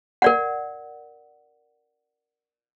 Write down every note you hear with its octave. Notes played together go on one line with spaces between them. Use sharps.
A#4 D5 F#5